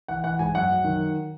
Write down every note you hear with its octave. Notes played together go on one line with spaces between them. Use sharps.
E3 F#5
E3 F#5
G#2 G#5
F#2 F#5
F#2
D#3